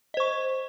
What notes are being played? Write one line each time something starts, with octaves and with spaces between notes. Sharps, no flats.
C5 D#5 C#6